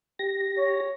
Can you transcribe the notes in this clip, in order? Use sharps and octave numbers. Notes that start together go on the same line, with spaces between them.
G4 A#6
C#5